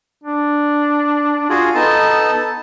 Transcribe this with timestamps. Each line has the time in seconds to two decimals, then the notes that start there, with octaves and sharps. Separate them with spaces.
0.24 D4
1.50 F4 F#4 G#4
1.75 B3 D#4 A4 A5